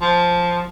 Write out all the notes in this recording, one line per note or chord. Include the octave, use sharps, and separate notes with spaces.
F3